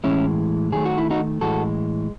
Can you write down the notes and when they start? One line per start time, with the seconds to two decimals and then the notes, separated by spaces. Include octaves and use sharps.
0.04 A2 E3 G#3 C#4 E4
0.72 D#3 F#3 A3 G#4
0.85 F#4
0.98 E4
1.10 D#4 F#4
1.41 A2 E3 G#3 F#4 A4